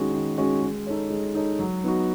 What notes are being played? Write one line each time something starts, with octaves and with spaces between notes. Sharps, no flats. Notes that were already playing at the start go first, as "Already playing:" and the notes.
Already playing: D#3 G#3 C#4 F#4
D#3
G#3 C#4 F#4
G#3
D#4 A4 C#5
G#3
D#4 A4 C#5
F#3
B3 D#4 F#4